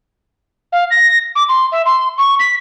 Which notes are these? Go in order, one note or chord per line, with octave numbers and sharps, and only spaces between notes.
F5
A#6
D6
C6
E5
C6
C#6
B6